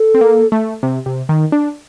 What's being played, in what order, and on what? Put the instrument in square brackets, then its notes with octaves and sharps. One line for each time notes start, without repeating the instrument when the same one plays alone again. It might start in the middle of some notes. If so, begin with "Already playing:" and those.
Already playing: [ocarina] A4
[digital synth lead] C4
A#3
A3
C3
C3
D#3
D4